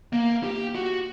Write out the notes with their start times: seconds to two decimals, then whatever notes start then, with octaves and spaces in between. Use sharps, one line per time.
0.13 A#3
0.44 G4
0.75 F#4